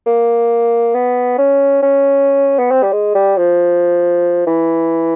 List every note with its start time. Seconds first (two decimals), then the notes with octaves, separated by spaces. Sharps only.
0.06 A#3
0.94 B3
1.38 C#4
1.82 C#4
2.59 B3
2.71 C4
2.83 G3
2.93 G#3
3.15 G3
3.38 F3
4.47 E3